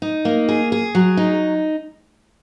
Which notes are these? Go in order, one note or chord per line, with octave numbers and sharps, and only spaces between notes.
D#4
A#3
G#4
G#4
F#3
D#4